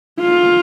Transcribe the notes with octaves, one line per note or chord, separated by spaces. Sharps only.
F4